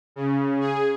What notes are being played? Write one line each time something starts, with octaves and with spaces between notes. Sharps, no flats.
C#3
G#4